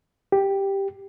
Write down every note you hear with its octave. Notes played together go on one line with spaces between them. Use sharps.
G4